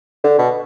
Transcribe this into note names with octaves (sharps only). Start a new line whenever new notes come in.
D3
B2